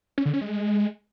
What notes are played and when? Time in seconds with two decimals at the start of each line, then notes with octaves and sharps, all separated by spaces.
0.18 C#4
0.26 D3
0.33 C#4
0.41 G#3